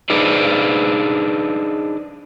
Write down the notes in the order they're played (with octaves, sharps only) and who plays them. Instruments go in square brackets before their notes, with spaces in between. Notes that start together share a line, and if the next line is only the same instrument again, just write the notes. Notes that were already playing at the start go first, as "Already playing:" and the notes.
[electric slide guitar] D4 D#4 G#4 B4 C5 D5